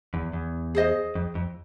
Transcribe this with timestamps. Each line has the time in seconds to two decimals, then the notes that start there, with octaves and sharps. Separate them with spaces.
0.14 E2
0.33 E2
0.75 G#4 C5 D#5
1.15 F2
1.35 F2